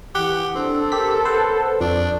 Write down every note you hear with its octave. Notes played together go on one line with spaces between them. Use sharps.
E3 G4 F#5
C4 D4 A4
G4 A#4 B6
B4 C5 F#5
F2 D4 D5